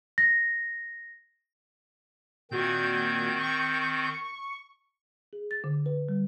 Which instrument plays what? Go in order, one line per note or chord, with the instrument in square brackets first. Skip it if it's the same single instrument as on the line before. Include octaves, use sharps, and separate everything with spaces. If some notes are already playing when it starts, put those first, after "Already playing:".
[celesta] A#6
[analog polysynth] A#2 F#4 G#6 [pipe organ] D#3 C4 G6
[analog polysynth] C#6
[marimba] G#4
A6
D3
B4
G3